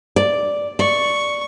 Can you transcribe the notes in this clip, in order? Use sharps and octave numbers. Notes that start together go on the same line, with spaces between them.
D5
D5 C#6